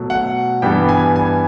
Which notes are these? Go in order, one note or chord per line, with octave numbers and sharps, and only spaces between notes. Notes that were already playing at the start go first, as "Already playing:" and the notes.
Already playing: B2 F#3 A3
F#5
G2 E3 G3 B3 D4 G5
G#5
G#5